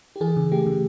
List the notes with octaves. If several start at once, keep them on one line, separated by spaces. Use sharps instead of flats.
G4
E3 G#4
C#3
A3 G4
C#3